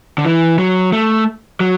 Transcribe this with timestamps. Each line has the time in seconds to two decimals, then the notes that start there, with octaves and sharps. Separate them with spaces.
0.18 D3
0.25 E3
0.59 F#3
0.92 A3
1.60 F#3